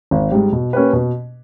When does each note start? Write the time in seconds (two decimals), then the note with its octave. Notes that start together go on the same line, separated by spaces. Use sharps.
0.11 G#1
0.31 G#2 G3
0.53 B2
0.73 A#3 C#4 G4 B4
0.93 B2